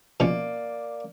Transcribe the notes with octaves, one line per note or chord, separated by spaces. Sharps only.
B2 F3 A#3 C#4 D5